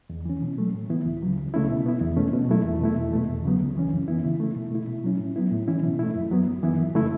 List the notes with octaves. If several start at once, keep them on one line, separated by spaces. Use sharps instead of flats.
E2
E3 C#4
B2
F#3 A3
A2
E3 B3 E4
C#2
C#3 F#3
C#2
C#3 A3 C#4 E4
B2
B3 E4
E2
B2 A3 C#4
B2
F#3 A3 E4
E2
B2 A3 E4
E2
B2 A3
E2
C#3 F#3 B3
C#2
C#3 E3 C#4
F#2
E3 B3 E4
C#3
A3 E4
B2
A3 E4
B2
F#3 C#4 E4
A2
F#3 B3 E4
A2
E3 C#4 E4
B2
A3 E4
F#2
F#3 B3
F#2
E3 B3 E4
F#2
C#3 A3 E4